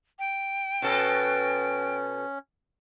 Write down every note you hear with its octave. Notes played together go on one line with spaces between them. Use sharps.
G5
B2 B3 C#4 A4